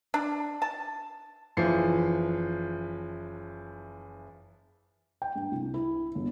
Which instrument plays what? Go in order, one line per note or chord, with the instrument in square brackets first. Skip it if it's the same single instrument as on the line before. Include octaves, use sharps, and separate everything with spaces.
[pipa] D4
A5
[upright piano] F#1 E3 F3 C7 C#7
[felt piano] G5
G2
C2
E4
G1